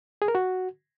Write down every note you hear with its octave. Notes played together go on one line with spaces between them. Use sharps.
G#4
A#4
F#4